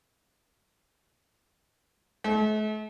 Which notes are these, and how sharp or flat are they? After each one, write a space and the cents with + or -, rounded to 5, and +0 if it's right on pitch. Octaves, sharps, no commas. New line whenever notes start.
A3 -45